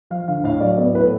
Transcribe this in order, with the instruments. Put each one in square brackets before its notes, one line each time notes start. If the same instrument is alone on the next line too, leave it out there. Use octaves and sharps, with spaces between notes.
[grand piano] F3 F5
D3 F5
A2 F5
F#3 D5
B3 D5
A2 B4
A4